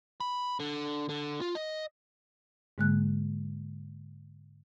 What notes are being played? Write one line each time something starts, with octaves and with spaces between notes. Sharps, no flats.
B5
D3
D3
F4
D#5
G#2 D3 G#3 A#3 F#6